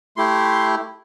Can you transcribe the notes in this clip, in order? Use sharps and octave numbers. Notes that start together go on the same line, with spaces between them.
A3 E4 G4 C6